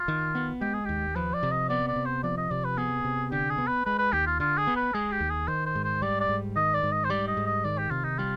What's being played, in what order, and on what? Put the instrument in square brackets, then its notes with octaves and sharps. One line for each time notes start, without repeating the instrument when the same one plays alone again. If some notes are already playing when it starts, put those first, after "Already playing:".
Already playing: [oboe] F4
[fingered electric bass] D#3
B3
[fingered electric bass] G#3 [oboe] G4
[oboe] G#4
[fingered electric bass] D#2 [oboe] G4
[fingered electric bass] F3 [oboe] B4
[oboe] D5
[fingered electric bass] C3
[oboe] D#5
[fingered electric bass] B3 [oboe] D5
[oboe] D5
[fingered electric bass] C3
[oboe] C5
[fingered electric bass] F3 [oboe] D5
[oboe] D#5
[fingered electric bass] C3 [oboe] D5
[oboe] B4
[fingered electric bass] B3 [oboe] G#4
[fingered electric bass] C3
[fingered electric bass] D3 [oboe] G4
[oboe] G#4
[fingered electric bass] B3
[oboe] B4
[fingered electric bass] G#3 [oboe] B4
[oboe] B4
[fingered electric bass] D#2 [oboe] G4
[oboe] F4
[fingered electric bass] D3 [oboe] F4
[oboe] G#4
[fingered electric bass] B3
[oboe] B4
[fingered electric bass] G#3 [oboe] G#4
[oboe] G4
[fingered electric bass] D#2
[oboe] G#4
[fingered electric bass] D#3 [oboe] C5
[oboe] C5
[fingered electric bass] G#2
[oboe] C5
[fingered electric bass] G3 [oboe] D5
[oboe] D5
[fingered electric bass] G#2
[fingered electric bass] D#3 [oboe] D#5
[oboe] D5
[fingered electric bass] G#2
[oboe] D#5
C5
[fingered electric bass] G3 [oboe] D5
[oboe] D#5
[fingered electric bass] G#2
[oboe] D#5
[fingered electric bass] D#3 [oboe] D5
[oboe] G4
[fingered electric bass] C3 [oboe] F4
[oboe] D#4
[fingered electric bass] G3 [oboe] F4